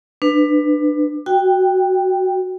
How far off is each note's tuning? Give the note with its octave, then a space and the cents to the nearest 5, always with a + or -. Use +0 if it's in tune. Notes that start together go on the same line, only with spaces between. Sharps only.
D4 +25 B4 +10
F#4 +0 G5 +0